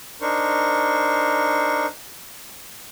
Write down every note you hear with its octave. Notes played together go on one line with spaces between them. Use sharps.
D4 D#4 A#4 C5 C#6